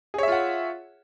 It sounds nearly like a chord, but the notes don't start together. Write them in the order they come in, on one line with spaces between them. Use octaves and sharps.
G#4 C#5 E5 F4 F#5